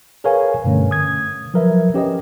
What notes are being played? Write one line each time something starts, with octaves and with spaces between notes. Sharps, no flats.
G#4 A#4 B4 C#5 F5 G#5
G2 B2 D3 A3 C#4
D#6 G#6
F3 F#3 A#4 B4 E5
C#4 G4 B4 D#5